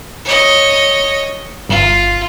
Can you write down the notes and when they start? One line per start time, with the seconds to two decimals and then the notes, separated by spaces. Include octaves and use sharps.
0.25 C#5 D#5
1.69 G1 F4